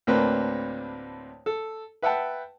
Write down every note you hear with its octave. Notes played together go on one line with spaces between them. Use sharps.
D2 A2 A#3 C4 D4 B4
A4
B4 E5 F#5 G5 A5